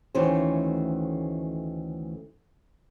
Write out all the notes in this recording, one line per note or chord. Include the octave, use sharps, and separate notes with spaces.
D2 D#3 E3 A3 C#4 C5